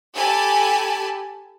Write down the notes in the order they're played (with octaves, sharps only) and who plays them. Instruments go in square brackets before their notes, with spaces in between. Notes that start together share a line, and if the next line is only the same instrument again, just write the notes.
[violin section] G4 A4 G#5 A5 B5